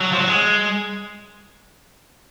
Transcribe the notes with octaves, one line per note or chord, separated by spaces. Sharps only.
F#3
F3
F#3
G#3